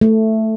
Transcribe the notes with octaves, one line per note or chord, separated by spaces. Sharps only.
A3